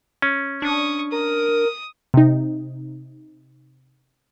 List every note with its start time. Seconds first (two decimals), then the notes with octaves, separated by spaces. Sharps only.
0.22 C#4
0.62 D4 C#6 D#6
1.12 A#4 D#6
2.14 C3 D#4